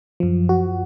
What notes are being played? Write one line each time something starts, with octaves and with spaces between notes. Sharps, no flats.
F#2 F3
F#4